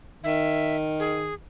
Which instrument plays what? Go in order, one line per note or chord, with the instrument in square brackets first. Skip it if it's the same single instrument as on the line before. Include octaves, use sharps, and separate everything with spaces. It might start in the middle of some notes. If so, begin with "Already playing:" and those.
[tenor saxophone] D#3 [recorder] E5
[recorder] G#4